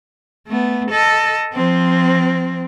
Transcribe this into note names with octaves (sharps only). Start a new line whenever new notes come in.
A3 B3
A4 D#5
F3 C4